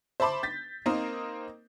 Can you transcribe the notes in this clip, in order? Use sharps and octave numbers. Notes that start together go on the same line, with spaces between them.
C5 E5 A5 B5 C6 D6
G6 A6 B6
A#3 C4 D#4 A#4 C5